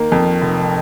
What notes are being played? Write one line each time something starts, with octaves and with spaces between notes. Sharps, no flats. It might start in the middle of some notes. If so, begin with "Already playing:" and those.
Already playing: D#3 A#3
F2
F1